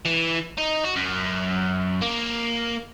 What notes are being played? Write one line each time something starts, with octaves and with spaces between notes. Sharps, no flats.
E3
D#4
F#4
F#2
A#3